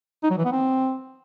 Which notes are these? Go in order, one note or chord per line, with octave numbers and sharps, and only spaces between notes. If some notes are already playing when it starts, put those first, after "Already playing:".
D#4
F#3
E3
B3
C4